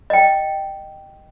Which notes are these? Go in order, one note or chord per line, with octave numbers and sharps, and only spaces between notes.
D#5 G5